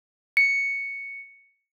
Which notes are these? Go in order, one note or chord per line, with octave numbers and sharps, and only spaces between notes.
C#7